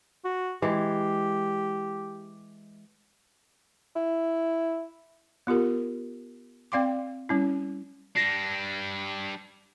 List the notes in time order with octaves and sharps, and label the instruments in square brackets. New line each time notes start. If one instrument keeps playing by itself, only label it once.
[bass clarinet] F#4
[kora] E3 G#3 [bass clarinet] G4
[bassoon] E4
[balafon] B3 F4 G4 A#4
C4 D5 F5 G5 C6 D6
G3 C#4 E4
[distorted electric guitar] G3 D4 [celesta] A#6 C7